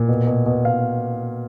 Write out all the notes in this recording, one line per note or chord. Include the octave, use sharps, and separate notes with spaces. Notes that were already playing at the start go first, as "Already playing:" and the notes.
Already playing: A#2
B2
B2
B2
B2 F5